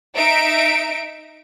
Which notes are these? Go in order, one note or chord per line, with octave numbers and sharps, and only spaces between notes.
D#4 E5 D7